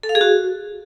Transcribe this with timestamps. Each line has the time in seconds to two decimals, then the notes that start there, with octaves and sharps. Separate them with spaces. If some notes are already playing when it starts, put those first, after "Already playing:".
0.03 A4
0.09 F5
0.15 G#4
0.21 F#4